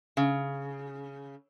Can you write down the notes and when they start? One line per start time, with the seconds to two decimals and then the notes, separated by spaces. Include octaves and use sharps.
0.17 C#3